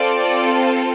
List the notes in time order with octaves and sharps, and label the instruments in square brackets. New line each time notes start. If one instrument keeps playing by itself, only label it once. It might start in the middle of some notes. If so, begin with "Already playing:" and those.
Already playing: [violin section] C4 F4 A4 D5